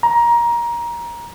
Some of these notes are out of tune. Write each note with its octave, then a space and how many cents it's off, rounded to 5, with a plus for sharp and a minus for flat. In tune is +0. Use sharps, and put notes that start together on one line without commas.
A#5 +20